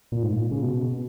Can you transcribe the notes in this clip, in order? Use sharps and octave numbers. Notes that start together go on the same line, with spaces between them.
A#2
G#2
A#2
C#3
B2